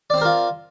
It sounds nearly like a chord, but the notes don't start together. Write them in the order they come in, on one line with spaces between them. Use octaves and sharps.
D5 C4 C5 A#4 F4